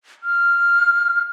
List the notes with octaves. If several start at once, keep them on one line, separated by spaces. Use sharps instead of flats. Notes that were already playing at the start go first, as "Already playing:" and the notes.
F6